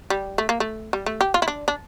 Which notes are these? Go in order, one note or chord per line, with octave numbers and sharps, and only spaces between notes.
G3
A3
A#3
A3
G3
A3
G4
F4
E4
D4
D4